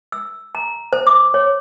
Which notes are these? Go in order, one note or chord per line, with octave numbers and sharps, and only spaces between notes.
E6
A#5
C5
D6
C#5